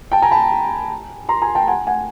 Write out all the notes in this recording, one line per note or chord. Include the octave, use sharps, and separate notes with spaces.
G5 A5
G#5 A#5
A5 B5
A#5 C6
G#5 A#5
G5 A5
F#5 G#5
F#5 G#5